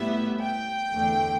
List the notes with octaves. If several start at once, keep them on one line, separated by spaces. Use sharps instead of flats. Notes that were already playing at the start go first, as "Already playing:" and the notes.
Already playing: A2 G3 B3 E4 E5
G5
E2 D3 A3